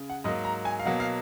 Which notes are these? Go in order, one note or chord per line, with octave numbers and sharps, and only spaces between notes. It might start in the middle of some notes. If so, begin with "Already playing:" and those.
Already playing: C#3
F#5
G#2 F#3 A#3 D#5
A#5
G#5
F5
B2 F#3 A#3 F#5
F5